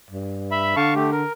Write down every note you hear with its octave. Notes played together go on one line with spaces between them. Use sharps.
G2
E5 B5
D3 F5 A5 C#6
A3 G4
A#4